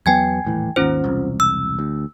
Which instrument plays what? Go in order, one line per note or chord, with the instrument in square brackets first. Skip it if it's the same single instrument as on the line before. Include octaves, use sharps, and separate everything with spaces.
[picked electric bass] E2 F#3 B3 [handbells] G5 G#5 G#6
[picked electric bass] D#1 A2 E3
[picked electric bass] G#1 D#2 [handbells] C#4 F4 C5
[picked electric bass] E1 C2
[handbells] E6
[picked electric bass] D2